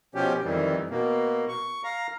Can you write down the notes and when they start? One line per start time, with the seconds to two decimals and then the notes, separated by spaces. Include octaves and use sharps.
0.15 B2 F3 C#4 G4
0.44 F2 D#3 E3 G3
0.90 B2 A#3
1.48 C#6
1.84 F5 A#5